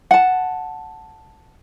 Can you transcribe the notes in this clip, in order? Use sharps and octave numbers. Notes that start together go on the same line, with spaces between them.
F#5 A5